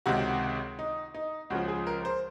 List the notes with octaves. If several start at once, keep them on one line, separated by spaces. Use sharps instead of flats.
C#2 C3 D#3 F#4
D#4
D#4
C#2 C#3 F3 F#4
G#4
A#4
C5